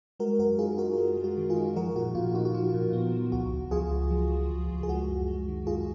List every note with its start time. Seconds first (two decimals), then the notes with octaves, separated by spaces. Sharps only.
0.20 G#3 F#4 A#4
0.39 F#2 F#4 A#4
0.59 D#4 F4 G#4
0.78 D#4 F#4 A#4
0.97 G#3
1.17 G#3
1.24 F#4
1.37 D#3
1.50 F4 G#4
1.56 D#4
1.76 F3 F#4 A#4
1.96 A#2 F#4
2.15 A#2 F4
2.35 D#4 F#4
2.45 F#4
2.54 F3 F4
2.74 A#2
2.93 B3
3.13 F3
3.32 C#2 F#4
3.52 C#2
3.71 F3 F4 G#4
3.91 C#2
4.11 F3
4.30 F3
4.50 C#2
4.70 C#2
4.83 G#4
4.89 G#3 F#4
5.09 F#2
5.28 G#3
5.48 D#3
5.67 F#2 F4 G#4